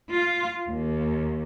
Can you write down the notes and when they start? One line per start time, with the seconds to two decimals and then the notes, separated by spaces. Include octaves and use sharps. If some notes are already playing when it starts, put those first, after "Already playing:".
0.10 F4
0.69 D#2